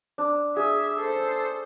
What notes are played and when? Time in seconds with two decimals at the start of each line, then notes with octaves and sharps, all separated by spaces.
0.18 D4
0.56 G#4 E5
0.99 A4 C5